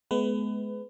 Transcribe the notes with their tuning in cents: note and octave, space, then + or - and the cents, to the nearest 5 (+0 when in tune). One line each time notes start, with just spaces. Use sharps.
G#3 +35 B3 +0 B4 +25